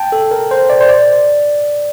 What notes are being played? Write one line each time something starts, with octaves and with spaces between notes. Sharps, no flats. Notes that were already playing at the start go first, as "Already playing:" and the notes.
Already playing: G5 A5
A4
A#4
C5
D5
C5
D5